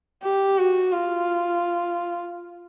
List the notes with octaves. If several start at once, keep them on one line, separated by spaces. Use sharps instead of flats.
G4
F#4
F4